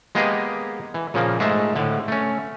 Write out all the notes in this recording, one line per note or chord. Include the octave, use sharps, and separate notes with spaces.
G#3 A#3 B3 G4 G#4 D#5
E3
A#2 C#3 F3 A#3
G#2 G#3 A3 E5
A2 D3
A3 C#4